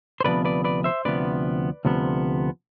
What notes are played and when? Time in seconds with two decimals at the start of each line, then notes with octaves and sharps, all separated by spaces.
0.21 C5
0.24 D2 C3 F3 B3 B4 D5
0.45 B4 D5
0.64 B4 D5
0.84 C5 E5
1.05 D2 C3 F3 B3 B4 D5
1.85 D2 C3 F3 B3